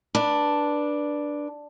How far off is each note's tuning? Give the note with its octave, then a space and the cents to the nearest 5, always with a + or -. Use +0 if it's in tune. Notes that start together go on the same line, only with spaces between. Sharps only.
D4 +0 B4 -20